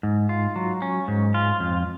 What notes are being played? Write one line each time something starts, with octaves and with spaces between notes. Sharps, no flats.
G#2
F4
F#3
C#4
G#2
F4
F2